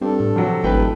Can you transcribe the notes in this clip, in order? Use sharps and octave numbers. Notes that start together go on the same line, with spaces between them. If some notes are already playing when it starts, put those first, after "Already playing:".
G2 C4 A4
A2
C3 F3 F#3
D#1 G#1 B4 G5